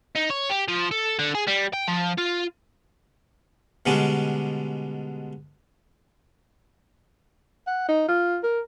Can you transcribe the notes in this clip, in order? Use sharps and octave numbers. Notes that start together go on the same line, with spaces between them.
D#4
C#5
G4
F3
A4
D3
G#4
G3
G5
F3
F4
B2 D3 G3 G#3 C#4 D4
F#5
D#4
F4
A#4